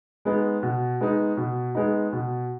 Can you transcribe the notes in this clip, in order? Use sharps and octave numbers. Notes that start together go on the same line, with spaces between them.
G#3 B3 D#4
B2
G#3 B3 D#4
B2
G#3 B3 D#4
B2